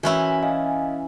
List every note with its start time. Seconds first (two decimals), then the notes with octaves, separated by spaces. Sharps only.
0.03 E3 C#4 E4 F#4 A#4 G#5
0.43 D#5 F5 G#5